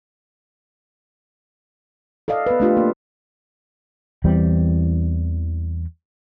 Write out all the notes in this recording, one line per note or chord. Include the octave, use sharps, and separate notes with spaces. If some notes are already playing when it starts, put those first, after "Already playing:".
A4 D5 D#5 F5
B3 B4
A3 D4 F4 G4
A#3
E2 E3 G3 C4